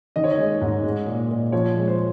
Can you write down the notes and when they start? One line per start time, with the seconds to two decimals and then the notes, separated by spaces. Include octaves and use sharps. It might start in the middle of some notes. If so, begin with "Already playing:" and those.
0.16 D#3 D#5
0.24 C#5
0.32 D#5
0.38 G#3
0.61 G#2
0.83 G#3
1.07 A#2
1.30 A#2
1.52 F3 C#5
1.76 G#3
1.88 C5